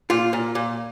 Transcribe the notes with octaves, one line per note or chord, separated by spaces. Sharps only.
A#2 F4
A#2
A#2